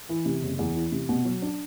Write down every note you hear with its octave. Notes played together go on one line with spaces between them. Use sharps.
E3
C3
F#1
E2
E3
C3
B2
F#3
D4